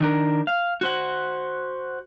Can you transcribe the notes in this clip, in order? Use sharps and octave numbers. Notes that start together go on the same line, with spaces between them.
D#3 D4 A#4
F5
F#4 C5 F#5